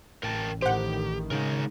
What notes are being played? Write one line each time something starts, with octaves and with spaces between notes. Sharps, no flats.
A1 A#4 G5 A5
A2 D#3 G4 C5 F#5
C#3 G#3 D#4 A#4